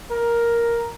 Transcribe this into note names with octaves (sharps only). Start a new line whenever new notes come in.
A#4